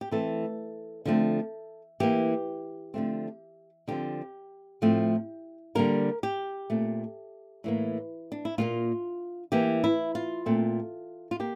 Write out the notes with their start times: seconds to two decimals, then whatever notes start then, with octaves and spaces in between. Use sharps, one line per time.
0.01 G4
0.11 E3 A3 C4 A4
1.05 D3 F3 A3 C4
2.00 E3 A#3 G4
2.94 D3 F3 A3 C4
3.88 D3 F3 C4 G4
4.82 A2 F3 A3 C4
5.75 D3 G3 A#3 A#4
6.23 G4
6.70 A#2 A3 C4
7.64 A2 E3 A#3
8.32 D4
8.45 E4
8.58 A#2 G3 A#3 F4
9.52 E3 A#3 G4
9.84 E4
10.15 F4
10.46 A#2 A3 C4
11.31 F4
11.40 A#3 G4